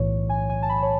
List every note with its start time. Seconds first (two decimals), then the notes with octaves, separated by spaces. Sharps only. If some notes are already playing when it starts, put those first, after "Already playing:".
Already playing: B1 A2 E3 C#5
0.29 G#5
0.50 G#5
0.62 A5
0.69 B5
0.83 C#5